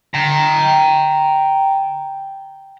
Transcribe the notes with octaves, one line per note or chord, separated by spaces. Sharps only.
G5 A#5